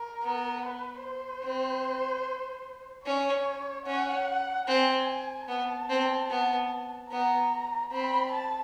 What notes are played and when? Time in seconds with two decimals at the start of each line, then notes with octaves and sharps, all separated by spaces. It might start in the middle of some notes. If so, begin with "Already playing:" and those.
Already playing: A#4
0.23 B3
0.62 B4
1.03 C5
1.44 C4
3.06 C#4 C#5
3.87 C#4 F#5
4.68 C4 G#5
5.48 B3 A5
5.90 C4
6.30 B3
7.11 B3 A#5
7.92 C4 B5
8.32 A5